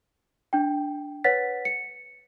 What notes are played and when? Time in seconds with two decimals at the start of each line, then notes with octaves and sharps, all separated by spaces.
0.53 D4 G5
1.24 B4 C#5 F#5 A6 B6
1.65 C#7